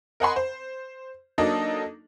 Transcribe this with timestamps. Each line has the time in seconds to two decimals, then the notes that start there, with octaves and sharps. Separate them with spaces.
0.20 A#4 D#5 F#5 G#5 B5 C6
0.36 C5
1.38 F#3 A#3 D4 D#4 A4 D#5